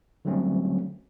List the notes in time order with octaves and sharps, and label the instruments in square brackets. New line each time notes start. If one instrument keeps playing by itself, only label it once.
[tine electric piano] D3 F#3 G3 A3 C4 C#4